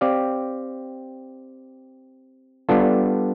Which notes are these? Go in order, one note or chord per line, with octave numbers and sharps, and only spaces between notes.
C4 G4 D5 F5
G3 B3 D4 F4 A4